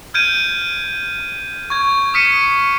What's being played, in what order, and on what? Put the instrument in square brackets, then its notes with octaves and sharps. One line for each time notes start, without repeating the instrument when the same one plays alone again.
[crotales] F6 G6 G#6 D7 D#7
C#6 G#6
D#6 F6 B6 C#7 D#7